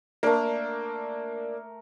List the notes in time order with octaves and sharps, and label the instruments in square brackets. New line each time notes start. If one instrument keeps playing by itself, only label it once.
[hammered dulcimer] A3 A#4 [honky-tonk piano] A#3 D4